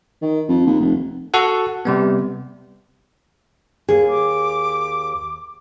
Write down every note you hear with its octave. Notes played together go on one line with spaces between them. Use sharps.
D#3
F2
D#2
F1
F#4 A4 F#5
C3 G3 B3
D#2 G#4
D6